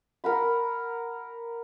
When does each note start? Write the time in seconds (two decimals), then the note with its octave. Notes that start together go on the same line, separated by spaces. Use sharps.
0.24 A#4 F#5 B5